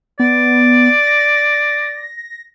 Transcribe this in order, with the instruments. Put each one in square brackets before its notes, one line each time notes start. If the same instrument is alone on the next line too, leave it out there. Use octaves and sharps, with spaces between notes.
[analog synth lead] B3 [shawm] D5
[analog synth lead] A#6